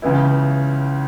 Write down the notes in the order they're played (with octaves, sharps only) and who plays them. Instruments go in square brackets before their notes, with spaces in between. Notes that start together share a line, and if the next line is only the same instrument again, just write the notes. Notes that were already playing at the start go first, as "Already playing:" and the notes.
[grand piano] C#2 C#3 E3 B3 E4